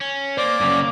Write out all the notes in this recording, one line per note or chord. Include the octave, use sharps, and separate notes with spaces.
C#4
A#3 C5 D5
F#2 C#3